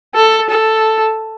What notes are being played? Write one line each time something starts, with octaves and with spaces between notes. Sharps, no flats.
A4
A4